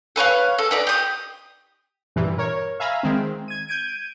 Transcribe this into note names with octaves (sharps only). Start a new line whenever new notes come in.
A4 B4 C#5 F5
A4
D#4 B4 D5
G4 D#6
G2 A#2 E3
A#4 C#5
E5 F5 G#5 A#5 B5
D#3 G#3 C4
G#6 D#7
G6 G#6 D7 D#7